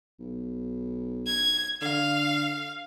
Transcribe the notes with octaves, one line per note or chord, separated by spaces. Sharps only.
B1
G#6
D3 F5